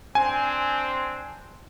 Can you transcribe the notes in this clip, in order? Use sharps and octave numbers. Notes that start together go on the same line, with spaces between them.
C4 D4 G#5